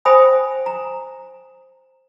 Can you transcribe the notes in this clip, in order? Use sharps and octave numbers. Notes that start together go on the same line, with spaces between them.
C5 E5 G5 G#5 B5 D#6
A#5